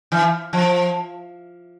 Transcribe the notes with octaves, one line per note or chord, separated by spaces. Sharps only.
E3
F3